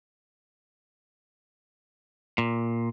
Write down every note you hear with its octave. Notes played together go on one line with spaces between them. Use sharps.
A#2